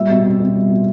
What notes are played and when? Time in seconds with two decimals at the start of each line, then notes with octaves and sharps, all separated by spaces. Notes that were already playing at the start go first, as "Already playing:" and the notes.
Already playing: A#2 G3 E5
0.10 B2
0.24 C4
0.40 B2
0.55 G3
0.70 B2